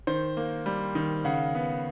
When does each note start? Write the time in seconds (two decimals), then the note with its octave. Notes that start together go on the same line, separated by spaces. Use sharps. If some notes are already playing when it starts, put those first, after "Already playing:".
0.07 D#3 C5
0.37 A#3
0.66 G3
0.95 D#3
1.25 C#3 F#5
1.55 B3